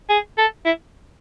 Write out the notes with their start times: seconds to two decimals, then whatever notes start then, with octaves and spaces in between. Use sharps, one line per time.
0.10 G#4
0.38 A4
0.65 E4